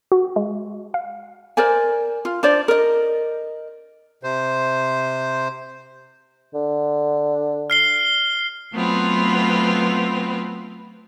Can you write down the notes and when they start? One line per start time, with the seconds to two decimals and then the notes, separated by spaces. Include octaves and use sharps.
0.12 F#4
0.36 G#3
0.94 F5
1.57 A#4 C5 D5 G#5
2.25 F4
2.43 D4 C5 D5
2.68 A#4 D#5
4.23 C3 C5
6.54 D3
7.70 F6 C7 G7
8.73 F#3 A3 B3 C4 F4 B4